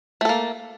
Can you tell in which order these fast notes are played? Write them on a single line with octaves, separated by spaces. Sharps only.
A3 A4 A#3